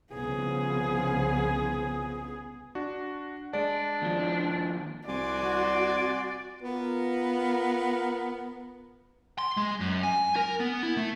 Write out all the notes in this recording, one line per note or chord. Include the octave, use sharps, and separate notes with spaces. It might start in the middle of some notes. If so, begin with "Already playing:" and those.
C2 C#3 F3 B3 G#4
D4 F#4
G#3 D4 D5
D#2 F3
C2 F#4 D5 G#5 C6 D6
B3 F4 A#4
C6
G#3
F#2
G#5
A#4
B3
E4
A3